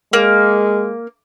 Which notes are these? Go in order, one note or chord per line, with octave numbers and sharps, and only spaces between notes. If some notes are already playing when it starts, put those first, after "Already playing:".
G#3 A#3